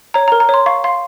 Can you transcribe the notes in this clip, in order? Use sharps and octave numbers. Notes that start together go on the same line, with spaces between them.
C#5 A#5
A#5
A#4
A#5
C#5 C6
F5 C#6
F5 C6